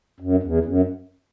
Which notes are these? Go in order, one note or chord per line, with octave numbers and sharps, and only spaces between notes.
F#2
E2
F#2